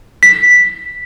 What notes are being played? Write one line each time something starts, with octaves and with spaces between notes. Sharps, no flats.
B6